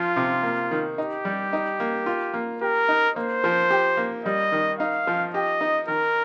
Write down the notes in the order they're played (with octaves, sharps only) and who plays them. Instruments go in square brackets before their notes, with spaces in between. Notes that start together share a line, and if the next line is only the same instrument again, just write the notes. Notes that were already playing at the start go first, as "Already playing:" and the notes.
Already playing: [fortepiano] F3 [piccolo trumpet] F4
[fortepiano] C3
A#3
D#3
[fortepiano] D#4 [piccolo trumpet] G4
[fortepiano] G3
D#4
A#3
F4
A#3
[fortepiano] G4 [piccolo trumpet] A#4
[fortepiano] D#4
[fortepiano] A#3 [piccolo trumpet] C5
[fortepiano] F3
G4
A#3
[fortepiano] G3 [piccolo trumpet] D#5
[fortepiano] D#3
[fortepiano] D#4 [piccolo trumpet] F5
[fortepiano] F3
[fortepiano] G4 [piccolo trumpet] D#5
[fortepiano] D#4
[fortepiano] D#3 [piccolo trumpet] A#4